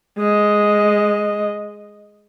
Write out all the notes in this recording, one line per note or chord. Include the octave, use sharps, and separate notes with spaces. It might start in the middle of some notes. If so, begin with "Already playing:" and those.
G#3 D#5